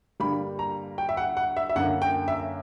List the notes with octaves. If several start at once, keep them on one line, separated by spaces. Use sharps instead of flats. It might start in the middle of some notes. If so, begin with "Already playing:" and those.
G2 D3 G3 A#3 B5
A#5
G5
E5
F#5
F#5
E5
E5
F#2 D3 A#3 F#5
G5
E5